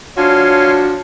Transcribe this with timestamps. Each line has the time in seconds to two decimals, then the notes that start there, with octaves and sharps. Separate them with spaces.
0.17 F3 D4 F#4 C#5 F5 G#5 C6